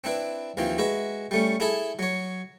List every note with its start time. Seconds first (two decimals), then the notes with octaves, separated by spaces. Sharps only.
0.04 C4 D4 E4 B4
0.57 D#2 E3 F3 C4
0.78 G#3 F#4 B4 E5
1.31 G3 A3 C#4
1.60 E4 G#4 A4 E5 A5 B5
1.99 F#3 C#5